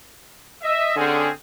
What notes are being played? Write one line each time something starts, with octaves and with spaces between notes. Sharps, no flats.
D#5 E5
D3 C4 C#4 G#4